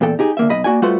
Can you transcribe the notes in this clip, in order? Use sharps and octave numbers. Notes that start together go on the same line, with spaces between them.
E2 A#2 A4 G5
D#4 G4 G#4
D2 A#3 E5
B1 D#5 B5
A#3 F#4 D5 G#5
G3 A3 F4 F#4 B4 C5